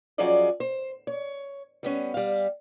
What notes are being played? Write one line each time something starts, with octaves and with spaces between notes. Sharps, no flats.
F3 F#3 C#4 G#4 D5 D#5
C5
C#5
G3 B3 C#4
G3 F5